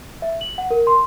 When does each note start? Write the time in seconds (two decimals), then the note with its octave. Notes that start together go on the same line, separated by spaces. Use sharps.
0.22 E5
0.41 F#7
0.58 F#5
0.71 A#4
0.87 C6